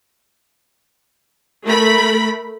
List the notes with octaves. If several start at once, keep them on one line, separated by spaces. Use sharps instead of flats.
A3 A#4 B5